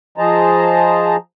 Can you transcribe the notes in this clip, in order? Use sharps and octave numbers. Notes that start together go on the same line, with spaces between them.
F3 G#4 C5 D#5 A5 A#5